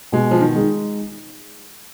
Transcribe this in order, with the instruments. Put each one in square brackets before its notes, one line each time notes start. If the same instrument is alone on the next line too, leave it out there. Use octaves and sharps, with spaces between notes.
[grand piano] B2 [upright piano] G#3
[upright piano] F3
D#3
[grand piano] G#3 D#4